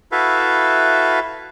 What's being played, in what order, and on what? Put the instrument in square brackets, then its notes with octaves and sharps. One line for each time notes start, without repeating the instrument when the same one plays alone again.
[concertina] E4 F#4 A4 B4 E5 F5